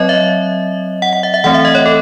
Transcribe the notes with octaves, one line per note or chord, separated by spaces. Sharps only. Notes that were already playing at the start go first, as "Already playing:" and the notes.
Already playing: F#3 C4 C#5 D#5
E5
F#5
F#5
E5
E5
E3 A3 C4 F#5
E5
D#5
C#5
A4